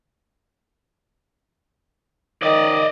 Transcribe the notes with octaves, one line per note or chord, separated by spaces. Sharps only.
D#3 D5 D#5